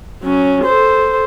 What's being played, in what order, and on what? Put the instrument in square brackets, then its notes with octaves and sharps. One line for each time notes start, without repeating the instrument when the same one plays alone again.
[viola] F#3 C#4
A4 C5